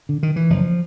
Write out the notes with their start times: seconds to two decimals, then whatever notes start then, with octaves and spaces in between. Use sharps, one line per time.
0.09 D3
0.23 D#3
0.36 E3
0.50 F#1 F3